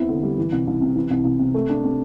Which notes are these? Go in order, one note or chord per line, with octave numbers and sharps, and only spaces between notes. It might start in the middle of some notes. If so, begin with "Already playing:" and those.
Already playing: E2 C4 E4
D3
G3
E3
C2
C2
C3
E3
C2
C2
C3
A3
D4
C3